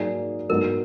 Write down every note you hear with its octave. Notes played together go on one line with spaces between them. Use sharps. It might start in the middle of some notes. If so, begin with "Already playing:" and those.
Already playing: G#2 F#3 A#3 D#4 G#4 D5
G#2 F#3 B3 A#4